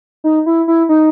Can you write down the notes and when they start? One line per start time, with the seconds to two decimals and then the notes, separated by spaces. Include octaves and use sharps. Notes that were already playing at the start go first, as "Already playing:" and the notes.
0.24 D#4
0.46 E4
0.68 E4
0.89 D#4